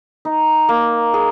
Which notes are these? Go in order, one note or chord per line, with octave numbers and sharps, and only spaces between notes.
D#4
A#3
G#4